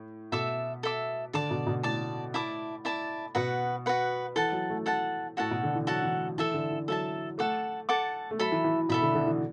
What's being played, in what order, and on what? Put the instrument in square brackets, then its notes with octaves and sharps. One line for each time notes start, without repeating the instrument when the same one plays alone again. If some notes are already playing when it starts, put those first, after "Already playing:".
Already playing: [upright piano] A2
[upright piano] B2 [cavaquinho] A4 E5 D6
[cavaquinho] A4 E5 D6
[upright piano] D3 [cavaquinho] D5 A5 D6
[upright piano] B2
B2
[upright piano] A2 [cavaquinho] D5 A5 D6
[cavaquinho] E4 D5 A5 D6
E4 D5 A5 D6
[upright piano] B2 [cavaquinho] F#4 B4 F#5
[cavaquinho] F#4 B4 F#5
[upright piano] E3 [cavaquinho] A4 F#5 A5
[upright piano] F#3
A3
[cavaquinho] A4 F#5 A5
[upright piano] A2 [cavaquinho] F#4 A4 F#5 A5
[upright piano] B2
D3
E3
[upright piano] F#3 [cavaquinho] F#4 A4 F#5 A5
[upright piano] E3
[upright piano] E3 [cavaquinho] A4 E5 A5
[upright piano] D3
E3
[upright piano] F#3 [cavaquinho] A4 E5 A5
[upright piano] A3 [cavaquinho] A4 F#5 A5 D6
[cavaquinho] A4 F#5 A5 D6
[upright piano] A3
[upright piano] F#3 [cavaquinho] A4 E5 B5
[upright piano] E3
E3
[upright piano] B2 [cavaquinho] A4 E5 B5
[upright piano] D3
D3
E3